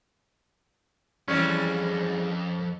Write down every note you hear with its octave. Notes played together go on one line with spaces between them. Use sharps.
F2 E3 G3 G#3 C#4